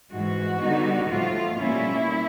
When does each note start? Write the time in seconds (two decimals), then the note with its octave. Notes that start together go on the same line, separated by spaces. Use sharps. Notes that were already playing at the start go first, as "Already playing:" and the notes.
0.11 G#2 E3 G#3 F#4
0.60 D3 G3 B3 D#4
1.10 A2 F3 A3 F4
1.59 B2 G3 A#3 C#4 E4